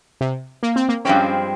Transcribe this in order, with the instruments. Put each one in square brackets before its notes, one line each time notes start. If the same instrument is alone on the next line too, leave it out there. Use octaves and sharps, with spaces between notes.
[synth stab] C3
A#3
C4
A#3
[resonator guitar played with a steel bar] G2 F3 G#3 C4 [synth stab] C#4